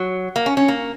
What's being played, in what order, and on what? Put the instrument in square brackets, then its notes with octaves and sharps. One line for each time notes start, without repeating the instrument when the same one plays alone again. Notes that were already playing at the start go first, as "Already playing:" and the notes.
Already playing: [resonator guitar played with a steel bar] F#3
A#3
C#4
C#4
A#3